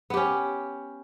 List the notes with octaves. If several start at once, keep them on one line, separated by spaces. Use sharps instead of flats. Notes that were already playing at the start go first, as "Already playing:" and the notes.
B3 C#4 G4